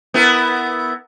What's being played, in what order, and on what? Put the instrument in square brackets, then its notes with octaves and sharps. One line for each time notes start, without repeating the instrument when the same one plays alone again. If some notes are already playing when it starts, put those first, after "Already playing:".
[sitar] B3 E4 A#4